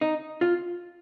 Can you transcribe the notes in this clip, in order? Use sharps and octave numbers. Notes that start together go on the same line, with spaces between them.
D#4
F4